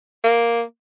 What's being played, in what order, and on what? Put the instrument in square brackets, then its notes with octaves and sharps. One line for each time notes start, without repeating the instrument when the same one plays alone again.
[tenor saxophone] A#3